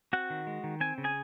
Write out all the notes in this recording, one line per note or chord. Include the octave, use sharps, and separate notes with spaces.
C4 F#4 F#5
D#3
G#3
D#3
C4 G#5
C#3
G#4 G#5